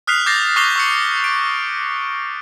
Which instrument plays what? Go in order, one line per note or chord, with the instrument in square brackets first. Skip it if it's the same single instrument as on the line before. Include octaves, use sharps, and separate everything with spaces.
[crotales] D#6 F6 F#6 B6 C7 F7
D6 G6 A6 A#6 C7
C#6 D6 F6 C7 F7 G7
C#6 E6 C#7
D7